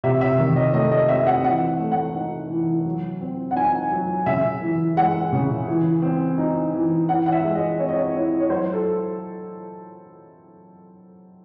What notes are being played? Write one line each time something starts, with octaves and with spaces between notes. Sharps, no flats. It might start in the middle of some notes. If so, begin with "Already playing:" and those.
C3 E5
E5
D#3
D#5
A3 D#5
D#5
C4 E5
F#5
E3 F#5
A3
F#5
D#4
E3
F#3
C4
F#5
D#4 G#5
F#3
C#3 E5
E3
G#3 F#5
C#3
E3
C4
D#4
E3
E3 F#5
F#5
E5
G#3
D#5
C4 C#5
D#5
C#5
E4
C#5
F#3 C5
A4